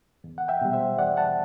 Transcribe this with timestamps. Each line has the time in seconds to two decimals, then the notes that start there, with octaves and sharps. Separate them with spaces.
0.24 E2
0.38 F#5
0.48 E5 G5
0.61 B2 G3
0.73 C5 E5
0.99 E2 D5 F#5
1.17 F#5 A5